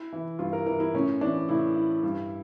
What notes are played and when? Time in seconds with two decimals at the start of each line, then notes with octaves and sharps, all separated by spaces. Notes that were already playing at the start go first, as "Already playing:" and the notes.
Already playing: E4
0.13 E3
0.39 G2 F4
0.53 A#4
0.66 E3 A#4
0.80 E4
0.94 A2 C#4
1.21 E3 D4
1.49 A2 E4
1.76 E3
2.03 G2